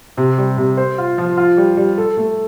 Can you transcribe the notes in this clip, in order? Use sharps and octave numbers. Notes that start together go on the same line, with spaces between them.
C3
G3
C3
C5
F4
F3
F4
G3
G3
A4
A3